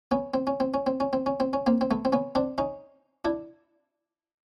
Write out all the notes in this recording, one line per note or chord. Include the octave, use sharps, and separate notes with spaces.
B3 C#4
C4
C#4
C4
C#4
C4
C#4
C4
C#4
C4
C#4
A#3 C4
C4
A3 B3
C4
B3 C#4
C4 D4
C#4 D#4
D4 E4